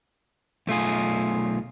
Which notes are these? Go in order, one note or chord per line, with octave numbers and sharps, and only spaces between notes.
B1 A3 F4 G#4